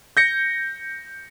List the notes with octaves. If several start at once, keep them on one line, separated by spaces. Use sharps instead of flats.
G6 A#6 C#7